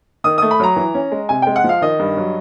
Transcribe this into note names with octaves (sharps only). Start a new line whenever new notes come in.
D#3 D#6
A3 D#6
B5
F#3 A#5
E3
C#4
G#3
C3 G#5
G#3 G5
F#5
F3
F5
D#3 D#5
G2
F#3